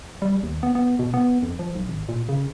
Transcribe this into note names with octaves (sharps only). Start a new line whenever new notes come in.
G3
D#2
B3
B3
B2
B3
F2
F3
B1
G#1
A#2
C#3